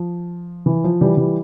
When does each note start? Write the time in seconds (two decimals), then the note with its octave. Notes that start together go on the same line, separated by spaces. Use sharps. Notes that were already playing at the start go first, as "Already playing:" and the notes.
Already playing: F3
0.66 E3
0.84 F3
1.01 E3 G3
1.17 E3 G3